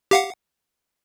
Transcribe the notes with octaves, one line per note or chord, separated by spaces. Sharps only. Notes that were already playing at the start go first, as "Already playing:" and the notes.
G4 F5 F#5